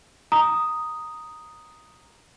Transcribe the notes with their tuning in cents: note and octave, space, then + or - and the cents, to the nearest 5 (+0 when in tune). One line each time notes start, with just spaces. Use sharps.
A#5 +0 D#6 +0